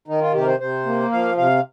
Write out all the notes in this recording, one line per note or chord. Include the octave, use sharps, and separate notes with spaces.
D#3 D#4
F4
C3 G4
A#4
C5
C3 C5
A#3
F3 F5
C3 F5